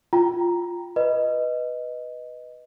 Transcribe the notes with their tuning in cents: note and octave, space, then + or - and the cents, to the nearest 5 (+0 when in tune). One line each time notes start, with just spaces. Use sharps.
F4 +0 G5 +0 A#5 +0
B4 +0 D#5 +0